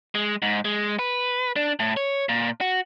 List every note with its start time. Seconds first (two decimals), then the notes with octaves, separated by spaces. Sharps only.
0.15 G#3
0.42 G#2
0.65 G#3
0.99 B4
1.56 D4
1.80 A2
1.97 C#5
2.29 A#2
2.61 F#4